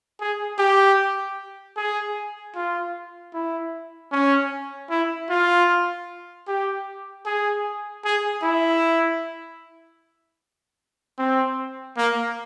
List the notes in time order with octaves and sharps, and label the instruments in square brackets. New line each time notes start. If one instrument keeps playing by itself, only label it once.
[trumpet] G#4
G4
G#4
F4
E4
C#4
E4
F4
G4
G#4
G#4
E4
C4
A#3